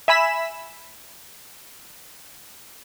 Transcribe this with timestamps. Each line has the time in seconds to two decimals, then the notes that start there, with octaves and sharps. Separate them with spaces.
0.08 E5 G#5 B5 B6 E7